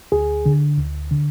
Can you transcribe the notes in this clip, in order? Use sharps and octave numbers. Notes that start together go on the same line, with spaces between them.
D2 G#4
D3
D2
D3